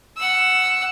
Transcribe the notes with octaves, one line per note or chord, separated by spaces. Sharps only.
F#5 E6